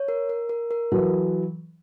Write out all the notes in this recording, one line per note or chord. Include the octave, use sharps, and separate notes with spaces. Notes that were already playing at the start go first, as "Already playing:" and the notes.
Already playing: C#5
A#4
A#4
A#4
A#4
E3 F#3 A4